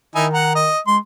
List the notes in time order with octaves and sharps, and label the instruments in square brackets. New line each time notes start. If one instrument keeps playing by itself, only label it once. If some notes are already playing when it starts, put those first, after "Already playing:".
[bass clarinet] D#3 [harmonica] D#4 E4 G#5
[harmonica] F#5 A#5
D#5
[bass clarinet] G#3 [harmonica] C6